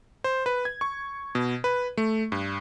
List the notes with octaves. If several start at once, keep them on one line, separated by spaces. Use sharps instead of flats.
C5
B4
G#6
C#6
B2
B4
A3
G2